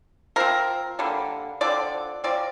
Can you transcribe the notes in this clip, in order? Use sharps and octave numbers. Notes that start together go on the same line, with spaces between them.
F3 C4 A#4
D3 G3 A#3
D3 F3 C4 D5
F3 C4 D5